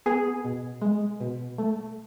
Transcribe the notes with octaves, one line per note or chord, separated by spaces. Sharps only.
B3 G#4
B2
G#3
B2
A3